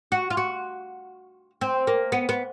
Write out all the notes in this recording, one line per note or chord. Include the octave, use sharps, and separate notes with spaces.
F#4
F4
F#4
C4
A#3
B3
B3